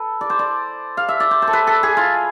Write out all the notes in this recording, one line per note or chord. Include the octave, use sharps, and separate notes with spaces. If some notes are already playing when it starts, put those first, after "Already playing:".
Already playing: A4 B4
D5
C5
D5
F5
E5
D5
C5
C5
A4
B4
A4
G#4
F4